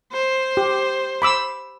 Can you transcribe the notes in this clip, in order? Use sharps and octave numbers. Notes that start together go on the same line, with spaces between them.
C5
G4
B5 D6 E6